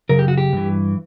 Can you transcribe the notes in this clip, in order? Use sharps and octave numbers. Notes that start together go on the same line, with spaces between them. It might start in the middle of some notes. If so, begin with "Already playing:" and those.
F#2 C#3 A#4
G4
F#4
G4
G2 E3